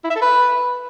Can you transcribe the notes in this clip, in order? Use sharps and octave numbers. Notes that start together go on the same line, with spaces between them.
E4
E5
A4
B4